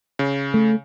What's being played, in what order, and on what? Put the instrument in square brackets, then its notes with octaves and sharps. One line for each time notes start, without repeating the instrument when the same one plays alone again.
[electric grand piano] C#3
[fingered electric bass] A3